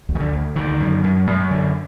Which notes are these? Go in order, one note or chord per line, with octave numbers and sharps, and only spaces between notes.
D2
D#3
D3
D2
D3 D#3
F#2
F#2
F#2
D3